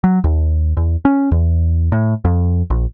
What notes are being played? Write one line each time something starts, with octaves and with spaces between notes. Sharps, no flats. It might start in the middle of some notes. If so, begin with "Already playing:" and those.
F#3
D#2
E2
C#4
E2
A2
F2
A#1